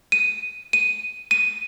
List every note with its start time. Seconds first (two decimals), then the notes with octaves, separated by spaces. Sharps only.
0.12 D#7
0.73 D#7
1.31 D#7